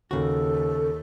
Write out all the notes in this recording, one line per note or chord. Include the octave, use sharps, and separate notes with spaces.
D#2 C#3 F#4 A4